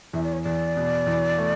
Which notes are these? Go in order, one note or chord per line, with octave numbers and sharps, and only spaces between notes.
E2 E5
D5
C#5
E2 D5
B2
E2
A3